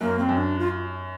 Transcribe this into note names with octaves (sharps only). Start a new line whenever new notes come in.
F#2 A#3
C4
F#2
D4
F4